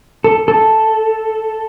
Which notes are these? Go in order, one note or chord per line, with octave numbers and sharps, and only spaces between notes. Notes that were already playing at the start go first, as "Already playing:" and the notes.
A4
A4